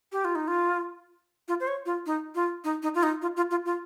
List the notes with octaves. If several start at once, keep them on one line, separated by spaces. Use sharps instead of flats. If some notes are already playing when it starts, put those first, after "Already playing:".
G4
F4
D#4
F4
F4
C5
C#5
F4
D#4
F4
D#4
D#4
F4
D#4
F4
F4
F4
F4